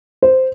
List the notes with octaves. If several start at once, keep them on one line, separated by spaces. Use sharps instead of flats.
C5